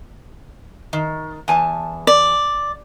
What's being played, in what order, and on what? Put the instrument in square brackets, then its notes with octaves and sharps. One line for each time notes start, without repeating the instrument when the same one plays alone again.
[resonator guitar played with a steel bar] D#3
E2 G#5 A5
[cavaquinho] D5